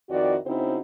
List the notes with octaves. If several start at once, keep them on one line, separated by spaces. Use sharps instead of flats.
F2 D#3 E4 F#4 D5
C#3 C4 D#4 E4 F#4 C5